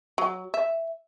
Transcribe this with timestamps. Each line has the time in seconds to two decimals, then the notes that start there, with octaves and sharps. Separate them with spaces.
0.18 F#3
0.54 E5